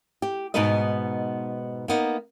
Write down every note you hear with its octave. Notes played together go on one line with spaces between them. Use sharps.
G4
G#2 B2 B3 D#4 B4 D#5
A#3 B3 D#4